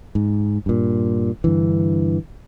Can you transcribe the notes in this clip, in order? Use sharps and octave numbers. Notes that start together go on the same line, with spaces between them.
G#2
G2 A#2
G2 D3 E3